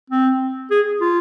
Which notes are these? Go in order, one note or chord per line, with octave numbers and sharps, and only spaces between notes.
C4
G#4
F4